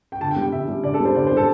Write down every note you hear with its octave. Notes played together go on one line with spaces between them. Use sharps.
G5
D3 A5
G5
G3
G5
D3 E5
G3
D3 D5
A4
G3 C5
D3 D5
C5
G3 A4